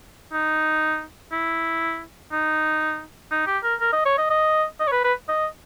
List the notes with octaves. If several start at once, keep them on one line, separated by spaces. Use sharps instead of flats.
D#4
E4
D#4
D#4
G4
A#4
A#4
D#5
C#5
D#5
D#5
D#5
C#5
B4
B4
D#5